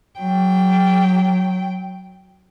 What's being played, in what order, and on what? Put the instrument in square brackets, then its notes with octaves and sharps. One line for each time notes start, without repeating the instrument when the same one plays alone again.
[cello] F#3 G5